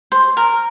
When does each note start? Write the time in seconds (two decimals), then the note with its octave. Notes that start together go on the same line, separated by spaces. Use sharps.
0.12 C5
0.37 A#4